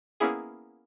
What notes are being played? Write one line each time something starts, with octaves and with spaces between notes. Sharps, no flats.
A#3 B3 C#4 E4 G#4